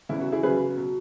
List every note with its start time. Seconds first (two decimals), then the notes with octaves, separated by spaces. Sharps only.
0.09 E2 C#3 E3 E4
0.21 F#4
0.32 E4 G#4
0.43 F#2 C#3 F#3 G#4 B4
0.76 B2 F#3